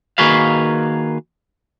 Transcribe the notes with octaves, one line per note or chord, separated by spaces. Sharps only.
D#3 A#3 F#4 G#4 B4 F5